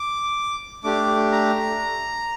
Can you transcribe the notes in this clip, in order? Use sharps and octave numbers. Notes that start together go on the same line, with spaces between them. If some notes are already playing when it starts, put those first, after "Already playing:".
Already playing: D6
A3 D4 G4 D6
A#5